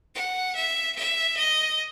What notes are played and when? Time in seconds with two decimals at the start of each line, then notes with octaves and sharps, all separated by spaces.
0.15 F#5
0.56 E5
0.96 E5
1.37 D#5